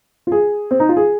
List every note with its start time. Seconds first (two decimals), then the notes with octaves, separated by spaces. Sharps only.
0.27 F4
0.32 G#4
0.71 C4
0.80 D#4
0.89 F4
0.97 G#4